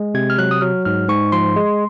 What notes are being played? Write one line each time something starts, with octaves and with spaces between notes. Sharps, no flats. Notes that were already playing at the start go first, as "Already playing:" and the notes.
Already playing: G#3
C3 G#6
F6
F#3 F#6
D#6
F#3 F6
G#2 F6
G#2 C#6
F3 C6
G#3